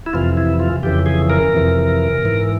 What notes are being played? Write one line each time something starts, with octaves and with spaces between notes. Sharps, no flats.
E4
F2 C3 E3 F4
E4
F4
F2 C#3 E3 G4
G#4
A#4
F2 C3 E3
G#2 E3